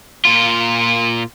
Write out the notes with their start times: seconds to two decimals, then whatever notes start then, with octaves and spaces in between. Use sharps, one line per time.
0.25 A#2 F4